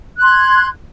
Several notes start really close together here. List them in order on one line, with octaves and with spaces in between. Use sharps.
F#6 C6 G#6